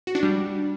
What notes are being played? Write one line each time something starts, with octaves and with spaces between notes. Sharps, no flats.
F#4
D4
G3